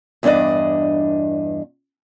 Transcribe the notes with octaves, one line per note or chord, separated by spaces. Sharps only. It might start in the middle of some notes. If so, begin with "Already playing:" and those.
E2 G2 D4 D5 D#5